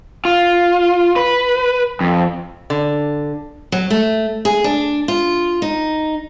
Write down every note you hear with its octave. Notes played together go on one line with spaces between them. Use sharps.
F4
B4
F2
D3
F#3
A3
G#4
D4
F4
D#4